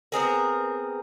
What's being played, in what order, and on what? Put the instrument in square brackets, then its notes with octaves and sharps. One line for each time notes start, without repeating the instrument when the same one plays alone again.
[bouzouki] B3 C4 G#4 A#4